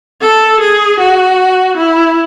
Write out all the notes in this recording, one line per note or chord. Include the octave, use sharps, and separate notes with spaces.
A4
G#4
F#4
E4